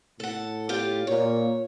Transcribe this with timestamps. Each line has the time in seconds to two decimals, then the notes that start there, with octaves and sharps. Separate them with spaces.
0.20 A2 A4 F#5
0.69 F4 G4 D5
1.07 A#2 C#5